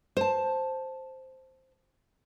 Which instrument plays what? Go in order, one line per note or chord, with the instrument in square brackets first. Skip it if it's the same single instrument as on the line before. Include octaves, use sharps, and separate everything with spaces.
[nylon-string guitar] C5 A5